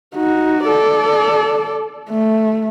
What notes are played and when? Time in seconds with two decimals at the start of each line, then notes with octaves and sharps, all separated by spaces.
0.16 D#4 F#4
0.65 A4 D5
2.09 A3